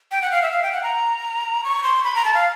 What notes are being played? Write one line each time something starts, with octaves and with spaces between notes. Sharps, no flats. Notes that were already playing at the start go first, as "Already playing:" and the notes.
G5
F#5
F5
E5
F5
G5
F#5
A#5
C#6
C6
B5
A#5
A5
F5